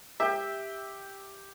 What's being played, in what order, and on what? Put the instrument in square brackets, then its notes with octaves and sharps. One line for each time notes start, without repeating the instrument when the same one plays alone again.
[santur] G4 G5 [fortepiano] E5